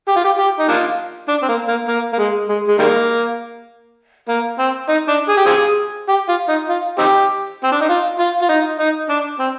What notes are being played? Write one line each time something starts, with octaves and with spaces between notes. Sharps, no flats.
G4
F4
G4
G4
D#4
A#3 D4 F4
D4
C4
A#3
A#3
A#3
A#3
G#3
G#3
G#3
D#3 G3 A#3
A#3
C4
D#4
D4
G#4
G4
C4 F4 G#4
G4
F4
D#4
F4
C4 D#4 G4
C4
D4
D#4
F4
F4
F4
D#4
D#4
D4
C4